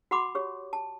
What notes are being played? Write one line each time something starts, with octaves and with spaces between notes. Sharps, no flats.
F#4 F#5 B5 C6 D6
G4 C#5
A5